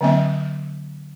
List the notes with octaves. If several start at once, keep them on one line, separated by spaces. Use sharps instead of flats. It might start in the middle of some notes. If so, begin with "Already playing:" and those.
D3 F#3 A#3 C4 D#5 E5